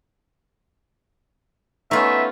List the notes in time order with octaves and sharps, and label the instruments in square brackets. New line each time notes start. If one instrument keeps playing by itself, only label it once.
[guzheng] A3 F4 [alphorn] B3 [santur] C#4 D#4 [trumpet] E5